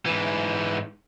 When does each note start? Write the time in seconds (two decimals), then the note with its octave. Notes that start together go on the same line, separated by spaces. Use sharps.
0.06 G#2 E3